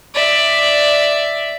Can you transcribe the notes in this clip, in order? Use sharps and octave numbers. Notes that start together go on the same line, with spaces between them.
D5 E5